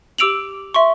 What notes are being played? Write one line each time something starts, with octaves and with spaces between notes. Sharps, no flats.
G4 D6 E6 D7 F7 F#7
E5 C6 C#6